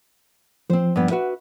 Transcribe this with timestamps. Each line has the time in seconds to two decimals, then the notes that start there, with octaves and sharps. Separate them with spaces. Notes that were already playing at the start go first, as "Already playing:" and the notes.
0.70 F3 C4 C5
0.96 G2 B3
1.10 F#4 B4 E5